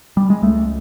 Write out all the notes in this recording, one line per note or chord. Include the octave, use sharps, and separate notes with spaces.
G3
G#3
C#2 A3